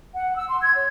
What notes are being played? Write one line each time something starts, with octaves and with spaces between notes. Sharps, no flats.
F#5
E6
C6
G#6
C#5